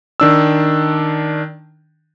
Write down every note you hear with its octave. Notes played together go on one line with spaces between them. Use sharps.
D#3 D4 E6